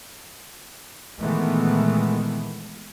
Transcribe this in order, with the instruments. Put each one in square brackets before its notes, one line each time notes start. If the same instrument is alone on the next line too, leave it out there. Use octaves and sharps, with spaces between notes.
[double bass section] A#2 D#3 E3 G#3 A3 B3